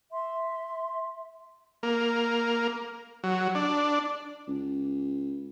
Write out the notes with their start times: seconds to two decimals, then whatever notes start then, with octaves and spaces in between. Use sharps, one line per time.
0.11 E5 C6
1.83 A#3
3.24 F#3
3.55 D4
4.48 C#2